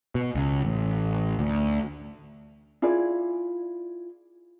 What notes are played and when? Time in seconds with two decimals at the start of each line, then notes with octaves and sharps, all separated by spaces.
0.15 B2
0.35 C#2
0.65 A1
1.39 D2
2.82 E4 F4 G#4 D5